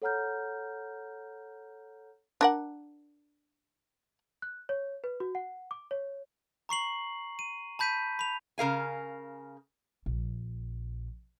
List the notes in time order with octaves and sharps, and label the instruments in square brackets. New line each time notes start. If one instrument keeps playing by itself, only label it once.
[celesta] A4 C#5 F#5 A#5 F6 G6
[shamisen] D4 A#4 F#5
[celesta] F#6
C#5
B4
F#4
F#5
D6
C#5
[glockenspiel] A#5 C#6 C7 F#7
D#7
A5 B5 G6 B6 D#7
B5 F7
[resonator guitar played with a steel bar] C#3 A#4 F5 G#5
[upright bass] A#1